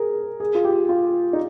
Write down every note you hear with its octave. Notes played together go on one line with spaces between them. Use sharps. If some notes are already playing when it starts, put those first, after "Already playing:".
Already playing: G#4 A#4
G#4
F4
G4
F4
D#4